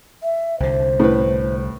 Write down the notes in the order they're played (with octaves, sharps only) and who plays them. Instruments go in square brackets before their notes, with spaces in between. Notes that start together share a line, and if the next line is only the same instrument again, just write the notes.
[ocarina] E5
[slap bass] C2 D3 [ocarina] C5
[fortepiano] A2 B4